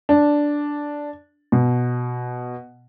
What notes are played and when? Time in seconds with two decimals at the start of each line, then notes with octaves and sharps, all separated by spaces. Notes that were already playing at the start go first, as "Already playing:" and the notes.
0.09 D4
1.52 B2